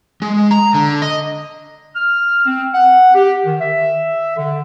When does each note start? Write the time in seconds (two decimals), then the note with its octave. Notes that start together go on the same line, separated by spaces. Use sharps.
0.22 G#3
0.51 A#5
0.74 D3
1.02 D#5
1.96 F6
2.46 C4
2.74 F#5
3.15 G4
3.45 D#3
3.60 E5
4.36 D3